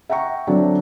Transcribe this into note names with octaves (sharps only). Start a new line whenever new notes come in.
E5 F#5 G5 A#5 C#6
D3 F#3 C4 D4